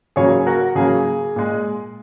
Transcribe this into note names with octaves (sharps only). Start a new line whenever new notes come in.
C#3 F#3 A#3 G#4 C#5
F#4 A#4
C#3 F#3 A#3 G#4
A#2 G#3